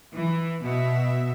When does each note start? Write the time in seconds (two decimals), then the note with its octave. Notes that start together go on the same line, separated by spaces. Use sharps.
0.13 E3
0.62 B2 E5